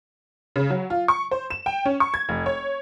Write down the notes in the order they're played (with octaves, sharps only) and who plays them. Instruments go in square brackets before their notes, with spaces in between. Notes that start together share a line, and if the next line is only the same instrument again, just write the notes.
[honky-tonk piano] C#3
F#3
F4
C#6
C5
E7
G5
C#4
C#6
G#6
F1
C#5